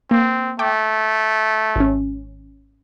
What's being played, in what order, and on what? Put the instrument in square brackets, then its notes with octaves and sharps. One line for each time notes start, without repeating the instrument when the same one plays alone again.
[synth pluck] A#3 [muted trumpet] C4
[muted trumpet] A3 [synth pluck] G5 D6
[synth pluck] G#1 C#4